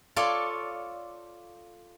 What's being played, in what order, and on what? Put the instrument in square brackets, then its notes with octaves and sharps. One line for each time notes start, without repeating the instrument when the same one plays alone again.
[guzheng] F4 A4 C#5 D5 C6